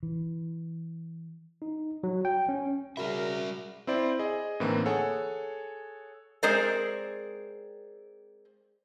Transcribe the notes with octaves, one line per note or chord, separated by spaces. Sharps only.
E3
D#4
F#3
G5
C#4
C#3 G3 F#4 A#4 D5 E5 B5
C4 E4 C5 D5
G#4 D#5
A2 D3 E3 A#3 C4 D#4
G#4 A4 C#5 F#5 G#5
G#3 C4 G#4 A#4 C5 D5